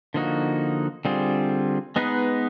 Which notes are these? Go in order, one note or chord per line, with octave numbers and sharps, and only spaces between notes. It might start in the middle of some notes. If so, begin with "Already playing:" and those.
D3 F3 A#3 D#4 F#4
D3 G3 C4 F4 G#4
G#3 B3 D#4 G#4 B4